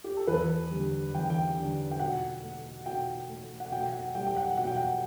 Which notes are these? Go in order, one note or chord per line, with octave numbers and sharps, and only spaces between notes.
G4
A4
E2 B4
D3 G3
E2 G5
G5
D3 G3
G5
B2 F#5
A3
B2 G5
A3
F#5
B2 G5
F#5
G3 G5
G5
F#5
B2 F#5
G5
F#5